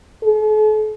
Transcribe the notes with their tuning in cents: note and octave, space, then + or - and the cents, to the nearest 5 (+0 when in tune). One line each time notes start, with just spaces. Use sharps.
A4 -45